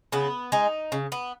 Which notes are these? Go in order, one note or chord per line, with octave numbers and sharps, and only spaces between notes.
C#3 B3
G#3 D#4
C#3
B3